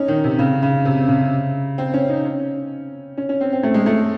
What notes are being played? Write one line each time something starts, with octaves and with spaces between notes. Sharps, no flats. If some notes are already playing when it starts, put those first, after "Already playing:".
Already playing: C#4 D#4
D#3
C3
C#3
C#3
C3
C#3
C4
C#4
D#4
C#4
C#4
C#4
C4
C4
A3
G#3
A3